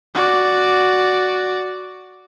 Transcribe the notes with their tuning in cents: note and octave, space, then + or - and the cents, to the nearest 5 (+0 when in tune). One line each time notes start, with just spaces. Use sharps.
F#4 +0 D5 +0